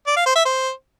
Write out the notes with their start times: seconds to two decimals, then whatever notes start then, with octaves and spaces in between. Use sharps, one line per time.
0.07 D5
0.16 F5
0.26 C5
0.36 E5
0.45 C5